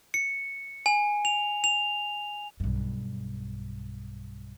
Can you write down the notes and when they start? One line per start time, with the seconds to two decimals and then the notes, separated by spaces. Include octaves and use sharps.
0.14 C#7
0.86 G#5
1.25 F7
1.64 F7
2.60 B1 G2